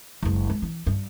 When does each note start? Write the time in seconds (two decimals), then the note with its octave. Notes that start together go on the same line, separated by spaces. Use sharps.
0.23 F#1 G#3
0.50 G#3
0.62 E3
0.87 G2